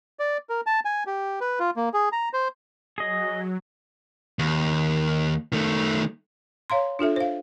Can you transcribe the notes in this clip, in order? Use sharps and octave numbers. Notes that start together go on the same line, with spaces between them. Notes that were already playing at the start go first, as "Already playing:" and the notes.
D5
A#4
A5
G#5
G4
B4
F4
A#3
G#4
A#5
C5
F#3 G#4 D#5
D#2
D#3 A3
C#5 F5 A#5 C6
D4 F4 A4 E5
C5 F5